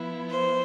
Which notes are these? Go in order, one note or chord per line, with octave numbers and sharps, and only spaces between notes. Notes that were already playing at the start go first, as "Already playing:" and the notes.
Already playing: F3 B3 E4
C5